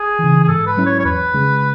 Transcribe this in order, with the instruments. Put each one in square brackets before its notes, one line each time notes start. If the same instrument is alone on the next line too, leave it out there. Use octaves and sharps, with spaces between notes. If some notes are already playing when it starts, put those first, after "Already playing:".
Already playing: [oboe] G#4
[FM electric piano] E3
C#3
[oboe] G#4
[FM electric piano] G#2 [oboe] A4
[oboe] B4
[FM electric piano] F#3 C#4 E4
[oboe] C#5
C#5
[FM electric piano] E2 [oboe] B4
[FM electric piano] C#3 G#3